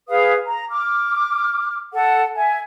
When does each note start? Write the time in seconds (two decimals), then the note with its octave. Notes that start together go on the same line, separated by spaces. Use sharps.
0.09 G#4 B4 F5 D#6
0.46 A#5
0.71 D6 F6
1.93 A4 F#5
2.36 E5 G#5